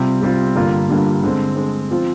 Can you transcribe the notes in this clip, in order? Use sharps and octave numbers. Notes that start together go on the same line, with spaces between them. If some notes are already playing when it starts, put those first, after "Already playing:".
Already playing: C3 G3 C4 F4
C3 G3 C4 F4
G2 D3 G3 A#3 F4
G2 D3 G3 A#3 F4
D3 G#3 C4
D3 G#3 C4
F3 C4 F4